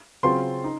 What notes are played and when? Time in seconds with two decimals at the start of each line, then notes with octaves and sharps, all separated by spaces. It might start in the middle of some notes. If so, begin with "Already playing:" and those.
0.23 C#3 F#3 C4 F4 C6
0.64 D#4